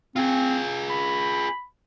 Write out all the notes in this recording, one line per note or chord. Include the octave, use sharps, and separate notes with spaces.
C4 F4 G#4
B5